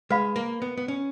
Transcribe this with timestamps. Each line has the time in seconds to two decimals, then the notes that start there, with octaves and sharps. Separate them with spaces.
0.10 G#3 B4 F5 B5
0.36 A#3
0.62 B3
0.77 B3
0.88 C#4